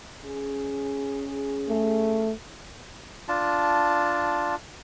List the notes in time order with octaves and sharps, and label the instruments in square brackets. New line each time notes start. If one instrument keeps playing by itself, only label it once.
[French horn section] C#4 G#4
[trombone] A3
[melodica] D4 F4 A5